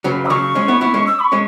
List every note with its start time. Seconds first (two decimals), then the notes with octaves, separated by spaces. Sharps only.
0.04 C#3 F#3 B4
0.25 E6
0.30 C#3 F#3 C#6
0.55 G#3 C#4
0.68 B3 E4
0.81 B3 E4
0.94 G#3 C#4
1.06 E6
1.19 B5
1.24 C#6
1.32 G#3 C#4